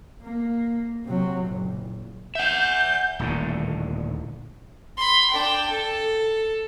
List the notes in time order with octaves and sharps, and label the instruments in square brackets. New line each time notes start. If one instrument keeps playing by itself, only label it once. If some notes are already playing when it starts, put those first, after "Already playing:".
[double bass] A#3
C3 F#3
F#1 A#2
[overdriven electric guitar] E5 F#5 [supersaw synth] G6
[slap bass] D#1 A2 D3
[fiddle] B5 C6
D4 G5
A4